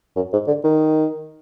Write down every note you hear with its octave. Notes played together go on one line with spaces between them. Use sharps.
F#2
G#2
D3
D#3